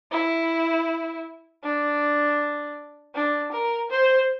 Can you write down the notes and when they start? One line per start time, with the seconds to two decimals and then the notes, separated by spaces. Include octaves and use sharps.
0.11 E4
1.63 D4
3.15 D4
3.52 A#4
3.90 C5